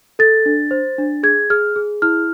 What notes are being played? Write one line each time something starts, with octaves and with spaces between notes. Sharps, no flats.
A4 A6
D4
C5
D4
G#4 G#6
G#4 F6
G#4
E4 F6